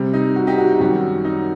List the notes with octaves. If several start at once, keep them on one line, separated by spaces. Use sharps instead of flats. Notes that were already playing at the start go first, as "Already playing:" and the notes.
Already playing: C3 G3
D#4
F#4
D#4 G4
F#4
D#4
F#2 D#3 G3 F#4
D#4